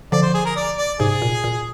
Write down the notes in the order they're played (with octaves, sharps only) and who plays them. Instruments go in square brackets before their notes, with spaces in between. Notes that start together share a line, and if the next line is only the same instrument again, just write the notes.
[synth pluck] D3 F3 [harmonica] D5
[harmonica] C5
G#4
A#4
D5
D5
[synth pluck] G#2 C3 [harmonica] G#4
[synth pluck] A#2
A#2